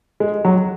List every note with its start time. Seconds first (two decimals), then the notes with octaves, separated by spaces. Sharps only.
0.20 G#3
0.45 F#3